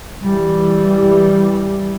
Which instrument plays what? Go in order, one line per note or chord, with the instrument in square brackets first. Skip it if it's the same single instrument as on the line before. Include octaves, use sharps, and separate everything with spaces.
[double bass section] E3 G3